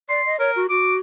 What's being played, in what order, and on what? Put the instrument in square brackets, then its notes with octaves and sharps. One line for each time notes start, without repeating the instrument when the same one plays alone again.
[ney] D5 [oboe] C6
[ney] D#5
[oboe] A#4 [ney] C#5
[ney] F#4
[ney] F#4 [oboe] D6